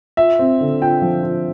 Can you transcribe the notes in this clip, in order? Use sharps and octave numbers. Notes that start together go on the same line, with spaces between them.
F4 E5
C4
D3
F4 G5
F3
F4